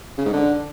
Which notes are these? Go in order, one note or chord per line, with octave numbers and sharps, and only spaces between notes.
C#3
G#2
D3